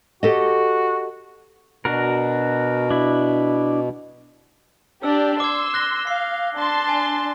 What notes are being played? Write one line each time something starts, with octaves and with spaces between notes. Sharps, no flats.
F#4 G4 A4 D#5
B2 D4 F#4 A#4
D4 E4
D4 G4 D5 E6
C6 D6 E6 G#6
F#6 A#6 G7
F5 C7
D4 A5 C6
G#5